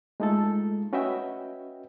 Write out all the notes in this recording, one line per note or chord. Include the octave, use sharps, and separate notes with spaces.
G#3 A3 D#4 F4 A4
C#4 F#4 B4 D#5 E5 G5